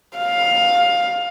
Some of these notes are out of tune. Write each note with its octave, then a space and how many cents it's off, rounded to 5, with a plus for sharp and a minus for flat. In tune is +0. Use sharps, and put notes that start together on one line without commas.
F5 +15